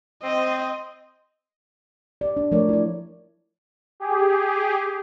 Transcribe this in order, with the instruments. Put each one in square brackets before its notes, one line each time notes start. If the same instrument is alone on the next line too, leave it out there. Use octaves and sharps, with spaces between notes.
[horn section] C4 [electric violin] D#5
[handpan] G4 D5
D4
F3 A3 D4 A#4 C#5 D5
E4 D5
[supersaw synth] G4 G#4